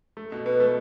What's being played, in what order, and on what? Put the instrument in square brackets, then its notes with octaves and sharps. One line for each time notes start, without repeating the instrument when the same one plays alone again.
[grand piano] A3
B2
[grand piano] B2 [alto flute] B4
[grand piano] A3